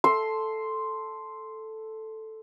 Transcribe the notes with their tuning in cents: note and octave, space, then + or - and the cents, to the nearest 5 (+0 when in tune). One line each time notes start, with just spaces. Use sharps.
A4 +0 C6 +0 E6 +5